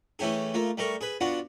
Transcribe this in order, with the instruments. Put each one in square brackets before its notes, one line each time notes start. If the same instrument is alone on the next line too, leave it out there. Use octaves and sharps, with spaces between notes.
[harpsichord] E3 A3 C#4 G4 G#4
A3 A#3 F4
G3 A3 A#4 C#6
G#4 B4
B3 D4 F4 F#4